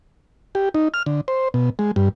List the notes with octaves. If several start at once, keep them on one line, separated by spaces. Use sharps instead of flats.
G4
D#4
F6
D3
C5
B2
G#3
G2